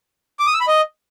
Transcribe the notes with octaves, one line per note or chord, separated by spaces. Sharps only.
D6
D#6
E6
B5
D#5